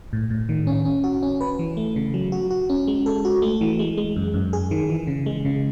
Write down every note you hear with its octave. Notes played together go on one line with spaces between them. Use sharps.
A2
A2
D#3
C#4
C#4
F#4
C#4
B4
E3
A3
C#3
F#3
F#4
F#4
C#4
G#3
A4
F#4
A3
E3
G#3
G#3
F#2
F#2
G#4
D#3
E3
C#3
G#3
C#3